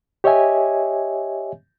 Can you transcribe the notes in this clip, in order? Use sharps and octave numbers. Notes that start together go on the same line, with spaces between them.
G4 C#5 D#5 E5 G#5